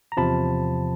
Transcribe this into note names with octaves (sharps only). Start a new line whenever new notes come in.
A#5
E2 C3 F3 A5 B5